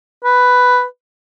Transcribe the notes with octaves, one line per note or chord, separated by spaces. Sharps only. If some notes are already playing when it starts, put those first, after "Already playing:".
B4